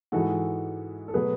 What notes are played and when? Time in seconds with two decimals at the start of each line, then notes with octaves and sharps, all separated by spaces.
0.12 G#2 E3 G#3 F#4 A4
1.08 A4
1.14 B2 F#3 A3 G#4 B4